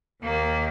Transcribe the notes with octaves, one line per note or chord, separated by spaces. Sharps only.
D#2 D#3 A#3